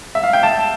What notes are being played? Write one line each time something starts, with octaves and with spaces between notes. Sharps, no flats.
E5
F5
G5
A5